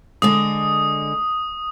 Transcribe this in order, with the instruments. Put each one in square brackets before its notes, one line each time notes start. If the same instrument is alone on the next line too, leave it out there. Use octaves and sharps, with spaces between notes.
[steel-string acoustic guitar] D3 G#3 D#5 [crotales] D#6